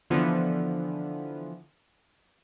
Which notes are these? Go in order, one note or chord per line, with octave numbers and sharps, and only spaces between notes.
D3 E3 F3 B3